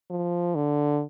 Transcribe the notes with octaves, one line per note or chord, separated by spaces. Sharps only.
F3
D3